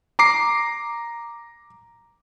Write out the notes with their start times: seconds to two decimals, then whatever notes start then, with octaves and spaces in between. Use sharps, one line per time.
0.19 A#5 D6 C7